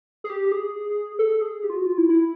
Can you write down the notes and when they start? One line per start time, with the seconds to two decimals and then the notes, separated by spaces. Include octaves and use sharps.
0.24 G#4
0.30 G4
0.52 G#4
1.19 A4
1.41 G#4
1.64 G4
1.70 F4
1.75 F#4
1.86 F4
1.98 E4
2.09 E4